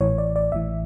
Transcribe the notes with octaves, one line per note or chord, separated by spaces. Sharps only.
A1 A2 E3 C#5
D5
D5
A1 A2 E3 E5